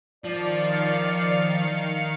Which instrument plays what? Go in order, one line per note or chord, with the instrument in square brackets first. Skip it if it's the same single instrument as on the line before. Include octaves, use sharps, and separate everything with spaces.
[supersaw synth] D#3 F5 C#7 [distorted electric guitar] F3 [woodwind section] D5